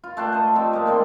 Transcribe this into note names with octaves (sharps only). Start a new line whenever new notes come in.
F4
A3 D4 G5 A5
C5 D#5
F3 C4 G4 D5
G#3 A#3
D#3 C4 D5 C6